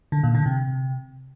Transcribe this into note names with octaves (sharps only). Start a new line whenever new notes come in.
D3
A#2
D3
C3